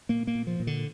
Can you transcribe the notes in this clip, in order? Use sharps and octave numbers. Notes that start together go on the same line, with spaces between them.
A#2 A#3
A#3
A#2
F3
A#2
D3